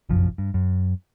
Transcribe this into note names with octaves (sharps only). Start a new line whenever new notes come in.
F1 A#1 F#2 F3
G2
F#2